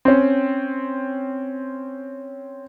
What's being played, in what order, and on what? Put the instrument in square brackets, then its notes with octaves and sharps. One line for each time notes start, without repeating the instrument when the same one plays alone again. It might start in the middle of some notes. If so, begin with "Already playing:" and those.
[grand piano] C4 C#4